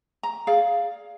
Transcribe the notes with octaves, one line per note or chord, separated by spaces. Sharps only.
A#5
G#4 D5 F5